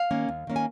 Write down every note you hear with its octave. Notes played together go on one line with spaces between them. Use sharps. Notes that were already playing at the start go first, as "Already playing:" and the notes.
Already playing: F5
D#3 A#3 C#4
D#2
D#3 A#3 C#4
G#5